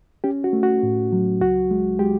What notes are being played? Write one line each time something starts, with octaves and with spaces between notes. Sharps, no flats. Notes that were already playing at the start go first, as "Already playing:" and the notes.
C#4 G4
F#4
A3
F#4
A2
F#3
C#2 F#4
G#3
G#3 G4